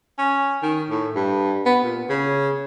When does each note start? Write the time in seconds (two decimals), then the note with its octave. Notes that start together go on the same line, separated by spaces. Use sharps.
0.18 C#4
0.63 D#3
0.90 A2
1.16 G2
1.66 B3
1.83 A#2
2.10 C#3